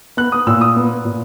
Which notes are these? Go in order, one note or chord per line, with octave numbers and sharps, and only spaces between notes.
B3 F#6
D#6
A#2 E6
D#6
B3
A#2